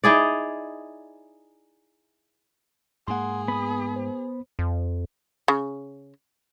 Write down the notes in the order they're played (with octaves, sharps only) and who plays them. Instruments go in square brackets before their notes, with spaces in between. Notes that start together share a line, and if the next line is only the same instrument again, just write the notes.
[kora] D#4 E4 G#4 D5
[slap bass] G#2 A#3 [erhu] G#4 [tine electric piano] F#5 C6
[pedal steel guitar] B3 D#6 [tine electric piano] B5
[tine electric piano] C5
[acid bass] F2
[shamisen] C#3